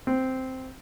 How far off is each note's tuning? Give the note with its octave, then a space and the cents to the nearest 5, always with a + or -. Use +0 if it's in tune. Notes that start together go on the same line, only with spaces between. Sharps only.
C4 -5